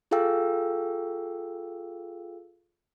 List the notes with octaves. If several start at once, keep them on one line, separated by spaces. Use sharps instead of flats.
F4 G#4 A4 F5 G5 E6